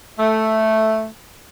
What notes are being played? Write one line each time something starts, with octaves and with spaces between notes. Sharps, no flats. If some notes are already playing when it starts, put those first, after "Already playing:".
A3